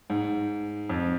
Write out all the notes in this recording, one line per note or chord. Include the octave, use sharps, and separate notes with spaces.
G#2
F2